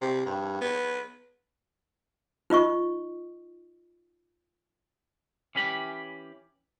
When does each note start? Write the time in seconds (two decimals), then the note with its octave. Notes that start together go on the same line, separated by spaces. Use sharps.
0.01 C3
0.26 G2
0.61 B3
2.50 D#4 F4 D#5 C#6
5.55 E3 C#4 G4 B5